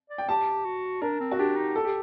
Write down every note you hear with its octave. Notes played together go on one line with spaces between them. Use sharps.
D5
G5
G4 A5
F#4
D4 A#4
C4
F#4
D4 G4
D#4
A4
G4